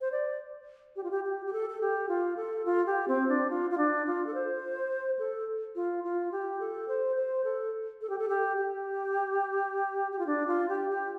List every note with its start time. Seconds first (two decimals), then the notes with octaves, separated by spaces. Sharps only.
0.01 C5
0.12 D5
0.96 G4
1.04 F4
1.11 G4
1.24 G4
1.46 G4
1.53 A4
1.70 A4
1.81 G4
2.09 F4
2.37 A4
2.66 F4
2.86 G4
3.08 C4
3.29 D4
3.50 F4
3.71 F4
3.78 D4
4.06 F4
4.27 A4
4.34 C5
5.19 A4
5.76 F4
6.04 F4
6.32 G4
6.60 A4
6.88 C5
7.16 C5
7.44 A4
8.01 A4
8.10 G4
8.19 A4
8.29 G4
8.57 G4
10.12 G4
10.19 F4
10.27 D4
10.47 F4
10.69 G4
10.90 G4